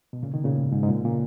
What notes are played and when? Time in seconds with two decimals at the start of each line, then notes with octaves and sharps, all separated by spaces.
0.13 B2
0.23 A#2 C#3
0.34 B2 D#3
0.44 A#2 C#3
0.56 G#2
0.73 G#2
0.83 G#2
0.88 A#2
1.05 A#2 C#3